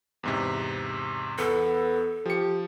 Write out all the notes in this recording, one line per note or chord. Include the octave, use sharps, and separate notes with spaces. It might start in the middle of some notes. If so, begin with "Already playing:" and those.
E2 G#2 C3
E2 B3 A4
F3 G4 C#7